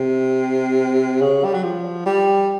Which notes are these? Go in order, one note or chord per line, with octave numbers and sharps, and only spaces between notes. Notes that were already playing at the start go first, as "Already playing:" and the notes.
Already playing: C3
C#3
G3
F#3
F3
G3